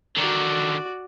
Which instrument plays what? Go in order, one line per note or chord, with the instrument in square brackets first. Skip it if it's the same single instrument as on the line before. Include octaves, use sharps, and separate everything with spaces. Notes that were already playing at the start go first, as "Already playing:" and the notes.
[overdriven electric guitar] D3 D#3 [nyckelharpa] F#4 D5